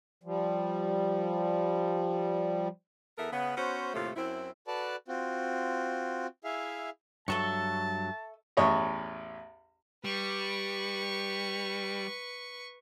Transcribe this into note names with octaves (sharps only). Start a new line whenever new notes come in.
F3 G3
E2 B3 A4 A#4 E5
C#3 B3
B3 C#4 F#4 C5
D#2 A2 C3 A3 F4
F#2 C4 E4
F#4 A4 B4 D5 A5
C4 F4 F#4
E4 G#4 E5 F5
G2 F#3 A4 E5 A5 C#6
A1 E2 C#5 D#5
G3 B4 C#6